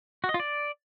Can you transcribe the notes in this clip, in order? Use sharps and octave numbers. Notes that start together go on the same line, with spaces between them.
F#4
D#5
F4
D5